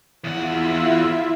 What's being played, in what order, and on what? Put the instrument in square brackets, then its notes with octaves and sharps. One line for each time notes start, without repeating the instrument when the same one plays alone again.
[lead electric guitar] E2 F#5 [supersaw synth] E4 F4 E5